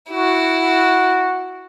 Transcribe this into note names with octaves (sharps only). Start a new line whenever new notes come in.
E4 F#4